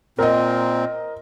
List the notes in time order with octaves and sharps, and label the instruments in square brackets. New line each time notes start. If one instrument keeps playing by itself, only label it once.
[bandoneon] A#2 C4 [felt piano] A#4 D#5